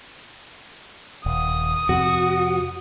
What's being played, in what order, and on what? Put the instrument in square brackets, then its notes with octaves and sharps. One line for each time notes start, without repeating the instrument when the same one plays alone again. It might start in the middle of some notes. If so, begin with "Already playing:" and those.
[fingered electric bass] D#1 [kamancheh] D#6
[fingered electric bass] F2 C3 [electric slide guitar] F#4